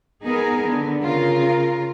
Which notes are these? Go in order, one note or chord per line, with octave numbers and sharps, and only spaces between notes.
B3 D#4 G#4 A#4
D3 B3
C#3 F4 A#4